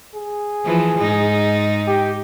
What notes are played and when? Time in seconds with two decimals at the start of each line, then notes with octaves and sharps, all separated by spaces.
0.15 G#4
0.65 E3 F3
1.00 G#2 D#4
1.87 G4